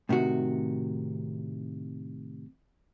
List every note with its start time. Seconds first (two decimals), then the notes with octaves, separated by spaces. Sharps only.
0.09 A2 C3 D#3 F#4